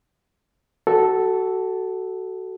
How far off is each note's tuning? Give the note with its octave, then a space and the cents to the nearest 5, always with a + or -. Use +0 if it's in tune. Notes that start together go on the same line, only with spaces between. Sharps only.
F#4 +25 A4 +0